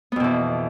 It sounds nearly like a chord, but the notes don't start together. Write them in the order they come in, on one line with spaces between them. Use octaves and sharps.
B3 F2 B2 E3